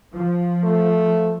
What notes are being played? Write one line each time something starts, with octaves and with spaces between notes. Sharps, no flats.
F3
A3